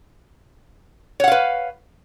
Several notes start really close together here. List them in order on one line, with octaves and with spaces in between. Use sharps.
C#5 F#5 F5 B4